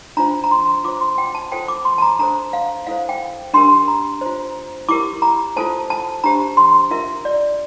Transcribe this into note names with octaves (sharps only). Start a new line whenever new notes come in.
D4 F4 C5 A#5
A#5
C6
F4 C5 D6
C6
G5
A5
F4 A4 C5 G5
D6
C6
A5
A#5
D4 A4 C5 A#5
F5
E4 A4 C5 F5
G5
D4 G4 A#4 C6
A#5
F4 C5
E4 G4 A#4 D6
A#5
F4 A4 C5 A5
A5
D4 G4 C5 A#5
C6
F4 A#4 E5
D5